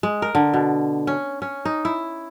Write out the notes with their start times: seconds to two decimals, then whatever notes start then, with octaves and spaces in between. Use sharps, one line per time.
0.03 G#3
0.22 A#4
0.35 D3
0.54 B2
1.07 C#4
1.42 C#4
1.65 D#4
1.85 E4